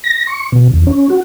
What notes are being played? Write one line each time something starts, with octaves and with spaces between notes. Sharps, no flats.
A#6
C#6
B2
E2
C#4
F#4